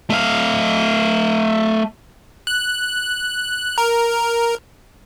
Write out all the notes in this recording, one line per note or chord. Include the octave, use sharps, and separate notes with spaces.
A3 F5
F#6
A#4